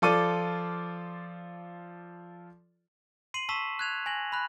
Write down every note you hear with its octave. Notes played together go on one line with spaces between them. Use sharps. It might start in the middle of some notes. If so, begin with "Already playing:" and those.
F3 F4 A4 D5 D6 D#7
C6 C7 D#7 F#7
A5 C#6 E6 B6 E7
F#6 G#6 F7
G#5 A#6 F#7
B5 F#6